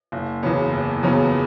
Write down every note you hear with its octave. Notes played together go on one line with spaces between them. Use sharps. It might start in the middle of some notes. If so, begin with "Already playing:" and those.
F#1
E2 C#3 F#3 B3
F#1
E2 C#3 F#3 B3